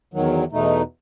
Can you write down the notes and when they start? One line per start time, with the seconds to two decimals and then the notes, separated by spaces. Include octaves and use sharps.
0.14 E2 D#3 F#3
0.52 E2 B2 A3 D#4